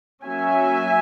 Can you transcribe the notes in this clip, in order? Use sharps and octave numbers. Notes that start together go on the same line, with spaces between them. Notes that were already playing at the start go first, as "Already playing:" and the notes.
F#3 A#3 C#4 E5 G#5